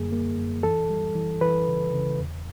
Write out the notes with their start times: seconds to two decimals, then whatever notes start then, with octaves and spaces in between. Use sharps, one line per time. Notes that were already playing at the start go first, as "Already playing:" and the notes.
Already playing: F#2 D3 G3 A#3 G#4
0.12 A#3
0.37 F#2
0.63 E3 A4
0.90 G3
1.15 E3
1.41 E3 B4
1.67 C#3
1.93 C#3
2.19 E2